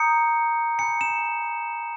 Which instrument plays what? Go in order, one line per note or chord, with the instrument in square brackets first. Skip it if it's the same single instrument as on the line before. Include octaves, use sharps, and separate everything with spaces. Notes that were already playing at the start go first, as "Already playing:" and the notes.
Already playing: [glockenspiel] A#5 D#6 G6 C#7
G#5 B5 G6 C#7
E7